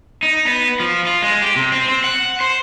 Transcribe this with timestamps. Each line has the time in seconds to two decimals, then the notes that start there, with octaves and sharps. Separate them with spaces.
0.23 D#4
0.47 B3
0.80 F3
1.07 F4
1.22 G#3
1.42 G4
1.56 C3
1.72 C4
1.88 C4
2.04 F#5
2.41 C5